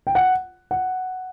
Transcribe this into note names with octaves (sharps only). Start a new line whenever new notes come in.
G5
F#5
F#5